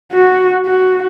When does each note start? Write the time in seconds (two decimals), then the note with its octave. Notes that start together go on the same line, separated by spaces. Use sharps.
0.13 F#4
0.66 F#4